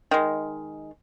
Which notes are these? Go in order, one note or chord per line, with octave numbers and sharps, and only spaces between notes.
D#3 G#3